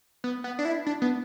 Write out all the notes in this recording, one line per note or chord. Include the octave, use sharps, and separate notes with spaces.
B3
B3
D4
E4
D4
B3